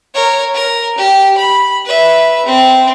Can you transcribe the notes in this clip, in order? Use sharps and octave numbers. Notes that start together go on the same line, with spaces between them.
A#4 C#5
A#4
G4
B5
B4 E5
C4